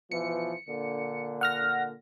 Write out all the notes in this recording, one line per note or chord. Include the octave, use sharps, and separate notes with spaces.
B2 E3 F3 C#7
A#2 D3
F#5 F6 A#6